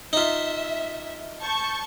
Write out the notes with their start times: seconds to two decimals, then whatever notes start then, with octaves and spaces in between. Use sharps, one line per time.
0.13 D#4 F4 E5
1.42 A5 C#6 G6